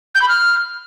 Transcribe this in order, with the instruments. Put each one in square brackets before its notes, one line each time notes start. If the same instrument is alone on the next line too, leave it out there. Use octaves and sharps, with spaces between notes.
[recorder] G6
B5
F6